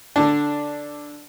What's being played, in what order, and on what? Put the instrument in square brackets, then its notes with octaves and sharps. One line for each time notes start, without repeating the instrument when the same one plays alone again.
[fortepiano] D3 D4